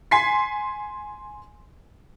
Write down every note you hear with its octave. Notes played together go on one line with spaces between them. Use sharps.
G#5 C6 B6 C7